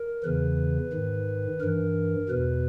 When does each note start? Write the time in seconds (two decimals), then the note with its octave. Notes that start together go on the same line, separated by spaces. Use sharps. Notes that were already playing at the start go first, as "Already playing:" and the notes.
Already playing: A#4
0.23 E2 C#3 E3 B4
0.93 G#2 D#3
1.61 G2 E3 A#4
2.29 E2 B2 B4